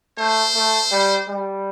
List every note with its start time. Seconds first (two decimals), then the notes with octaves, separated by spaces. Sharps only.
0.18 A3 C5
0.55 A3
0.91 G3
1.28 G3